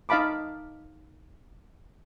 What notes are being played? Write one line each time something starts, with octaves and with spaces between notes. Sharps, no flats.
D#4 D#5 F5 A5 B5 D6